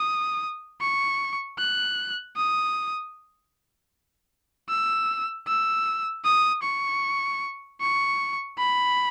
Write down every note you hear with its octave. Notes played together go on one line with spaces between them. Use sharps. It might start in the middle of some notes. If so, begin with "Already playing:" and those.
Already playing: D#6
C#6
F#6
D#6
E6
E6
D#6
C#6
C#6
B5